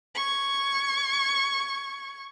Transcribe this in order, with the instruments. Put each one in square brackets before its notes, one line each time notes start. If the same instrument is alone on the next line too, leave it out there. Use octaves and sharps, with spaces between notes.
[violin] C#6 G#6